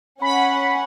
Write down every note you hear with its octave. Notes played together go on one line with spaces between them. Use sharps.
C#4 F#5 B5